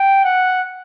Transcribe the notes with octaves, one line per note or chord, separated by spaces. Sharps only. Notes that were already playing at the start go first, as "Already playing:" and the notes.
Already playing: G5
F#5